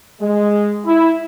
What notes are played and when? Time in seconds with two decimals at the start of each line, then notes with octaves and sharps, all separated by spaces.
0.21 G#3
0.85 E4